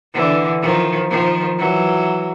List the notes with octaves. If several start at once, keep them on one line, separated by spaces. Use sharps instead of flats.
D3 E3
D#3 F3
D#3 F3
E3 F#3